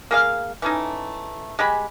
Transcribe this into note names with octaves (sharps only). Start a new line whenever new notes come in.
A#3 G#4 F5
E3 A3 C#4 D#4
G#3 G4 G#5 B5